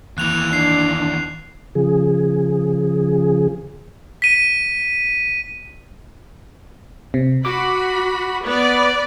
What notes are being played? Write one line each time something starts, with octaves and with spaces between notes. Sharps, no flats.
D#2 E3 F#6 F7
D4 C7
C#3 F3 G#4
B6 D#7
C3
F#4 B5 D6
B3 B4 D5